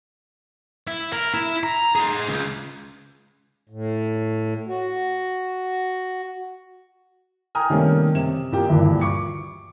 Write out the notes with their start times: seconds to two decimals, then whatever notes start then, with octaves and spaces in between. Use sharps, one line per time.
0.87 E4
1.13 A#4
1.34 E4
1.63 A#5
1.95 G#4 C5
2.29 C#2
3.69 A2
4.68 F#4
7.55 G5 G#5 A#5 D#6 F6
7.70 C3 D#3 G3 A3 A#3 C#4
8.15 C3 E7
8.52 A#2 A#3 G4 G5
8.68 D2 G2 A#2 D3 E3
9.01 C#6 D6 C#7